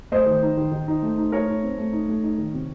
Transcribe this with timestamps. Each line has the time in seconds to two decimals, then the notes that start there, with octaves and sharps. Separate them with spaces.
0.12 A3 C5 D#5
0.26 D#3
0.42 D#4
0.57 D#3
0.72 D#3
0.88 D#4
1.02 A3
1.18 D#4
1.32 A3 A#4 C#5
1.47 D#4
1.63 C4
1.78 A3
1.93 D#4
2.08 A3
2.23 D#4
2.38 D#3
2.53 C3